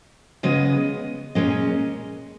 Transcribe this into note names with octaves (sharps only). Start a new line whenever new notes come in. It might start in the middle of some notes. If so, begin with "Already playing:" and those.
C#3 G#3 B3 D#5
A#2 G#3 C#4 D#5